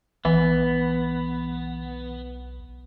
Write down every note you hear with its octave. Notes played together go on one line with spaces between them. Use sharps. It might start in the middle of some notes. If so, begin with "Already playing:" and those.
B1 E3 B3